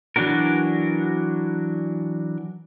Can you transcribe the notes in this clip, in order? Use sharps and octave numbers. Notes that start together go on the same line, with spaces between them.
E3 F#3 D4 F#4 A#4